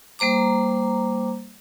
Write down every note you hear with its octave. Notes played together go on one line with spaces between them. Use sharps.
G3 A#3 C5 A#5 D6